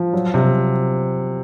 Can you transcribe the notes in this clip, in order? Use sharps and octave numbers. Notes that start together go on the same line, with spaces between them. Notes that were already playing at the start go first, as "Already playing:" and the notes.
Already playing: F3
F#3
C3